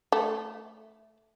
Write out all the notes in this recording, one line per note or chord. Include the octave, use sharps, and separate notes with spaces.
A3